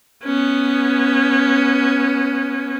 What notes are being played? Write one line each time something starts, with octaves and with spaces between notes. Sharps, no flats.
B3 C#4